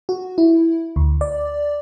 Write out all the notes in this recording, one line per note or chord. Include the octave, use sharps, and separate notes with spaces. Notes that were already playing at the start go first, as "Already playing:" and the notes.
F#4
E4
D2
D5